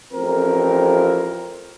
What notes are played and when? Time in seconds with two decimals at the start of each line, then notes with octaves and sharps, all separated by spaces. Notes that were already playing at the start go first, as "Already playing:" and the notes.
0.13 A1 F2 C4 A#4